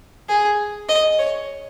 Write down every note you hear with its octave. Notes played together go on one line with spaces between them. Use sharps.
G#4
D#5
C#5